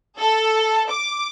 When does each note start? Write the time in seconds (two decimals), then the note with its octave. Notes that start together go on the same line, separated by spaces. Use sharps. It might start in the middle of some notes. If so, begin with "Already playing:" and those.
0.19 A4
0.88 D6